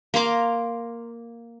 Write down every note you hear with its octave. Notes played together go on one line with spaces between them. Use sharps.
A#3 A#5 C6 D6